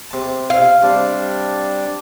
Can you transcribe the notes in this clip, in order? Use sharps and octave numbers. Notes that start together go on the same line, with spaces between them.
C3 A5
F5
C3 G3 D4